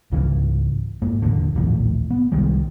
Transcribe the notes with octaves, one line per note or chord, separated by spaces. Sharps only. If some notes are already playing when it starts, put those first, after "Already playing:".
C#2 G#2 C#3 E3
G#2 A#3
D#1 B1 E2 D3
A#1 D#2 A2 E3
B3
C2 D#3 G3 G#3